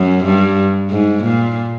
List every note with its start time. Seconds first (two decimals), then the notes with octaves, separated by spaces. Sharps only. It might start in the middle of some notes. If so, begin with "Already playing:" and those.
Already playing: F#2
0.24 G2
0.90 G#2
1.24 A#2